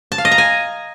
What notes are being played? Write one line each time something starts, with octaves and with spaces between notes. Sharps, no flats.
A5
F5
D#5
A#5
G#5